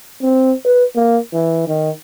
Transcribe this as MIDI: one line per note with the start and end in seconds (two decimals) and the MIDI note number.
0.22 0.53 60
0.65 0.84 71
0.96 1.19 58
1.33 1.65 52
1.68 1.90 51